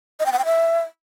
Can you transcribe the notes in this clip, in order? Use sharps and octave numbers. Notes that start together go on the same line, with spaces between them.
D#5
G5
F#5
G5
E5